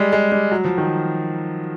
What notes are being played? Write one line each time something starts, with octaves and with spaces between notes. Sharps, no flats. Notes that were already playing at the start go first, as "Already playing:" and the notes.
Already playing: G3 G#3
G#3
G3
F#3
F3
D#3